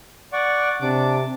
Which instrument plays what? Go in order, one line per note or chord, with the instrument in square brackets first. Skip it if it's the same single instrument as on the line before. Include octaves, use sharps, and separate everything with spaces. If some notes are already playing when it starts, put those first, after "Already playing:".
[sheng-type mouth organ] D5 F#5 C#6
[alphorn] C3 [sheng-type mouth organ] D4 D6